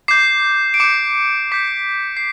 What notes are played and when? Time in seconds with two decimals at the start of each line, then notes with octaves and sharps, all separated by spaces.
0.08 D6 G6 C7
0.74 D7
0.80 D6 G6 C#7
1.52 D6 G6 B6
2.17 C7